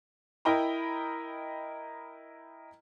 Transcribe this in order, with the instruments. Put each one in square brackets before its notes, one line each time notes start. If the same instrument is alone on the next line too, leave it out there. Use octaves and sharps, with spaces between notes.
[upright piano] E4 A#4 D#5 G5 A#5 B5